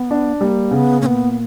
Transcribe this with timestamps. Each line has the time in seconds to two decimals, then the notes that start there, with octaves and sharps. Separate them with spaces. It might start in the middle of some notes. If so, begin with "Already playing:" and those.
Already playing: B3
0.11 D4
0.41 G3 A#3
0.71 C#3 B3
1.01 A#2 C#4
1.06 B3
1.31 B3